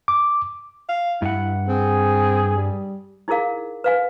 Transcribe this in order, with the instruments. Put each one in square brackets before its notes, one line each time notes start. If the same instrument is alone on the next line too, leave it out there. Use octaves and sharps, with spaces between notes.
[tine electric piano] D6
[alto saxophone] F5
[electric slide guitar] G2 F#5 [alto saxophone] E4
[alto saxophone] C4 [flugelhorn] G#4
[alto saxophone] G3
[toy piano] D#4 E4 G#4 A#4 F5
B4 F5 G#5